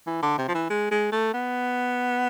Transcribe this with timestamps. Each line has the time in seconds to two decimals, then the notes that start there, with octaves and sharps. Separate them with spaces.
0.07 E3
0.23 D3
0.38 C3
0.48 F3
0.54 E3
0.70 G#3
0.91 G#3
1.12 A3
1.34 B3